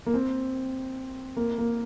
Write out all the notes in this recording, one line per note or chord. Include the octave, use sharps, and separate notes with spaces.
A#3
C4
A#3
A#3